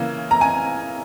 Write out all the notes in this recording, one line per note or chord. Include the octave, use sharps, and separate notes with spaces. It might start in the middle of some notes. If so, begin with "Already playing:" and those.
Already playing: C#3 E3 A#3
A#5
G#5